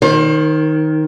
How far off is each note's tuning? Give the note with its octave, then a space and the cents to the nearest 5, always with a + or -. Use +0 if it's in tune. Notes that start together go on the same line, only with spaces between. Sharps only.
D#3 +5 C5 +35